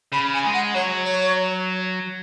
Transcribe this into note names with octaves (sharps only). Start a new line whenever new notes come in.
C#3 B5
G#5
G#3
F#5
F#3 C#5
C#5